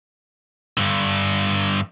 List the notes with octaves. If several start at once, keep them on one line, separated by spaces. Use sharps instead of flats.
G2 D3